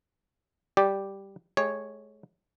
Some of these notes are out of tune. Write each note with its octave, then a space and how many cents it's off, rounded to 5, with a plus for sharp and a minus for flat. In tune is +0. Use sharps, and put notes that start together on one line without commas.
G3 +0 G4 +0 D5 +0
G#3 +40 G4 +40 C#5 +0